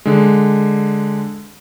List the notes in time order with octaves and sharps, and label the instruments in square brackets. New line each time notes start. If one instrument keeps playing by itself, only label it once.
[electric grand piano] D3 G#3